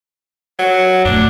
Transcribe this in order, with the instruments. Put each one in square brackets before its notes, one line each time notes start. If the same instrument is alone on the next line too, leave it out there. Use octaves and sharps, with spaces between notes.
[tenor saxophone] F#3
[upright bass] F#2 A2 [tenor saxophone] D4